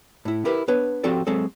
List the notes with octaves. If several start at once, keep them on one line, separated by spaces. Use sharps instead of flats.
A2 E4
E4 G4 A#4 B4 E5
B3 D4 B4 C#5
F3 C4 F#4 G4 A4 D5
F#3 G#3 C4 A4